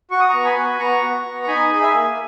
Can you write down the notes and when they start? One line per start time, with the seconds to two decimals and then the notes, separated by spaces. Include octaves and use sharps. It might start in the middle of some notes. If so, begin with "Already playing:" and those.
0.11 F#4 C#6
0.20 D#6
0.29 B3 A#5 C#6
0.45 G#5 B5
0.56 F#4
0.79 B3 A#5 C#6
1.02 F#4
1.25 B3
1.43 C#6
1.48 D#4 G#5 B5
1.70 G#4
1.82 E5 G#5
1.93 A#3